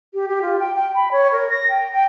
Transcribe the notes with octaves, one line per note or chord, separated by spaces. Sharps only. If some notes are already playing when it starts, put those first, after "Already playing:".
G4
G4
F4
G5
G5
B5
C#5
A#4
A#6
G5
G5